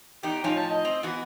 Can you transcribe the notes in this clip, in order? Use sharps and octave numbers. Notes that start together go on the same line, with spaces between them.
E2 D#4 G4
A2 F3 C#4 D#4
A5
D#5
C4
E3 B3 F#4